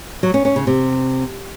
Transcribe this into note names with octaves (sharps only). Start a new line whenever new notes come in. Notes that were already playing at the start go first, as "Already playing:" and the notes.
F#3
C#4
C#4
C#3
C3